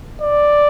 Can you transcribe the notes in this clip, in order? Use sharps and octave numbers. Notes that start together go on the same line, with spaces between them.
D5